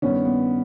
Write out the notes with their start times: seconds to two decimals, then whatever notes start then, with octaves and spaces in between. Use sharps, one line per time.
0.02 G2 D#3 B3 C#4
0.25 B3